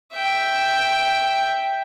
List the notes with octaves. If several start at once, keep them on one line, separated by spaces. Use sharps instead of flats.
E5 G5